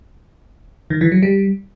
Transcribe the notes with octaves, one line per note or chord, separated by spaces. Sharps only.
D#3
E3
F#3
G3